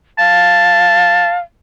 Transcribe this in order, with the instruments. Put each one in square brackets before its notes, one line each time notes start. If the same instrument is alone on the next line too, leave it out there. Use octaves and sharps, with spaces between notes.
[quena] F5 [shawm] A5